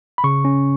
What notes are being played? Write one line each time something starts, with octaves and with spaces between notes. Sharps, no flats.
B5
C#3 C#6
C#4